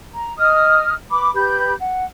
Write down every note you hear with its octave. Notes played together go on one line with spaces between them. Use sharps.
A#5
D#5 D#6 F6
B4 B5 D6
G4 B4 B5 G6
F#5